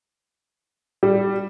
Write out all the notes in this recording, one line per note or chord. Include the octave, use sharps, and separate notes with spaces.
G3